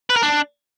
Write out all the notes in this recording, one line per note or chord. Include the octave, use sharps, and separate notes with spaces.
B4
A#4
D4